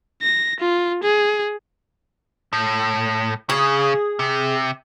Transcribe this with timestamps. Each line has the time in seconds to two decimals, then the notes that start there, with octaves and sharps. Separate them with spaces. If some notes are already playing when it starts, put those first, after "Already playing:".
0.23 A#6
0.60 F4
1.03 G#4
2.53 A2
3.50 C#3 G#4
4.19 C3